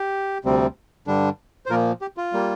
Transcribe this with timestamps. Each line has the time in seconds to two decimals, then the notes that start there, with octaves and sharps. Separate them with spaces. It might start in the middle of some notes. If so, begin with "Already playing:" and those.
Already playing: G4
0.45 D2 C3 G3 C4
1.07 G2 D3 G3 D4
1.66 C5
1.70 A#2 F3 A#3 F4 A#4
2.02 G4
2.17 F4
2.33 G3 A#3